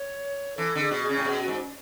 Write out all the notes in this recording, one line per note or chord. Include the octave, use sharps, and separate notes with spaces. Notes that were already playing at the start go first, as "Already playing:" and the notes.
Already playing: C#5
E3 A4
D3 G#4
B2
G#4
C#3
A2
B2 G#4
F#4
G#2